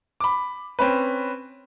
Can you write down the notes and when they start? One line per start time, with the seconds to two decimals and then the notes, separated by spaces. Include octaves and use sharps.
0.20 B5 D6
0.79 C4 C#4 B4